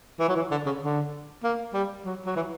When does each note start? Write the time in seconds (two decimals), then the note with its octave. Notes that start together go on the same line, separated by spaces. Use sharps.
0.19 E3
0.29 F#3
0.36 E3
0.51 D3
0.66 C#3
0.82 D3
1.44 A#3
1.74 G3
2.05 F#3
2.26 F#3
2.36 E3